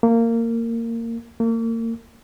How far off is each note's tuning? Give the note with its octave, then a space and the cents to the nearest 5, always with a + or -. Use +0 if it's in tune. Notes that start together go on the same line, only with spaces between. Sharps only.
A#3 -20
A#3 -35